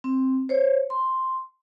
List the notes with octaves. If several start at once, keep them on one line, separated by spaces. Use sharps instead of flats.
C4
C5 C#5
C6